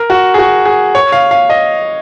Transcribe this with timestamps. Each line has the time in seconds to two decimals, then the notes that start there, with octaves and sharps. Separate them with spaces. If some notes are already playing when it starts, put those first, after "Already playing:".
Already playing: A#4
0.10 F#4
0.34 G#4
0.38 F#4
0.65 G#4
0.95 C#5
1.12 F5
1.31 F5
1.50 D#5